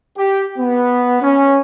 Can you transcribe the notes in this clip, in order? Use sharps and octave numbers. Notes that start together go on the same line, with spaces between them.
G4
B3
C#4